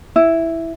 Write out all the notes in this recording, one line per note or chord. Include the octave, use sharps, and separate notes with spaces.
E4